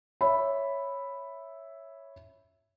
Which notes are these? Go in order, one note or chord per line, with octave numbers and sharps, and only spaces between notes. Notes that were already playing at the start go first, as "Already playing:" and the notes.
C#5 E5 B5